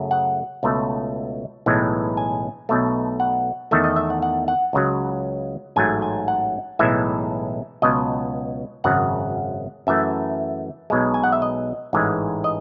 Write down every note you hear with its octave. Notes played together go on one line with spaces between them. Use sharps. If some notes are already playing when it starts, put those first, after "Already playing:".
Already playing: F#2 C#3 F#3 A3
F#5
C#2 B2 A3
B1 A2 E3 G#3
G#5
B1 B2 A3
F#5
E2 D#3 A3 E5
D#5
E5
F#5
F#5
F#5
C#2 C#3 F#3
A1 G#2 F#3 A3 G#5
G#5
F#5
B1 A2 E3 G#3 E5
C#2 B2 F#3 D#5
G#1 F#2 C#3 F#5
F#2 E3 A3 E5
B1 B2 G#3
G#5
F#5
E5
D#5
A1 G#2 E3 G#3
D#5